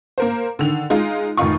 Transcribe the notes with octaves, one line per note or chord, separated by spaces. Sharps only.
A#3 A#4 C5
D3 D#3 F7
G#3 D#4 F4
F1 D#3 D#4 F4 C#6